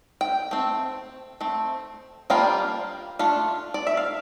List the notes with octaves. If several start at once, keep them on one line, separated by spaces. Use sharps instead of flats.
G5
A3 C4
A3 C4
G3 A#3 D4 F4 G5
A3 D4 F4
D5
E5
F5